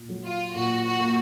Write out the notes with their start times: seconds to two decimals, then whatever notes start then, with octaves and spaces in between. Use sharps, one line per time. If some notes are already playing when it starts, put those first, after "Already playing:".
Already playing: A#2
0.09 F#3
0.25 F4
0.54 A#2 F#4
0.84 F#4
0.99 A#3